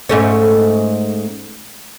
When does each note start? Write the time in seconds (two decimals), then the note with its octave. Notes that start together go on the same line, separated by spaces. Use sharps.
0.09 G#2 A3 C#4